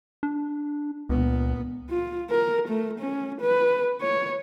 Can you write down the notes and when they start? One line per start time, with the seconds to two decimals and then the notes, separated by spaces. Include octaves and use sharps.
0.23 D4
1.09 C#2 A#2 B3
1.89 F4
2.30 A#4
2.68 A3
2.99 C#4
3.41 B4
4.01 C#5